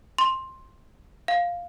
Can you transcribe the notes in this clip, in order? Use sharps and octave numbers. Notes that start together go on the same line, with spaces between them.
C6
F5